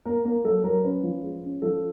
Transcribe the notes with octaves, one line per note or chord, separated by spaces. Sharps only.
A#3 A#4
A#3 A#4
F#3 A4
F#3 A#4
C#4 B4
F3
G#3
C#4
F3 A4